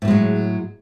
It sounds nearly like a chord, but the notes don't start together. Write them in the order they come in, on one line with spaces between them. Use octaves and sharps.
A2 A#3 G#3 F#3